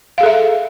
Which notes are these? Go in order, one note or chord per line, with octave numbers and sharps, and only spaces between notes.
G#4 A4 E5 F5